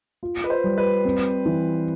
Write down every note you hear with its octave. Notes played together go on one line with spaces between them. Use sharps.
F4
B4
C5
G3
B4
C4
E3